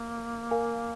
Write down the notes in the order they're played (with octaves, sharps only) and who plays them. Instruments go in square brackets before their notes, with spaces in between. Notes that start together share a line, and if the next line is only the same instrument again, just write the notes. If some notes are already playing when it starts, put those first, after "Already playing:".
Already playing: [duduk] A#3
[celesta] A#4 F5 G#5